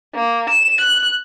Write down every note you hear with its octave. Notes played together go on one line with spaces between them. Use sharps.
A#3
E7
F#6